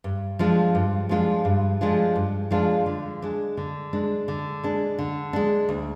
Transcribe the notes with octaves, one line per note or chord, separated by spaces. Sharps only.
G2
F3 G#3 D4 F4
G2
F3 G#3 D4 F4
G2
F3 G#3 D4 F4
G2
F3 G#3 D4 F4
D3
G#3 D4
D3
G#3 D4
D3
G#3 D4
D3
G#3 D4
D2